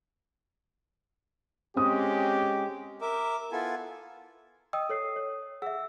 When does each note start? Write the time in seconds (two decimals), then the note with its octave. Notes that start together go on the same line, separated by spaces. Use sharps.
1.76 G#3 C4 C#4 G4 D#6
3.01 A#4 E5 D6
3.52 B3 E4 F4 A4 G#5
4.73 D#5 G5 D#6 E6
4.89 A4 C#5 C7
5.16 C#5
5.62 G#4 E5 F#5 E6